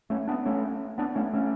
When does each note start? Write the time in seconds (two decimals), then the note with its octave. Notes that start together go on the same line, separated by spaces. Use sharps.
0.10 A3 C#4
0.28 B3 D4
0.46 A3 C#4
0.98 B3 D4
1.15 A3 C#4
1.33 A3 C#4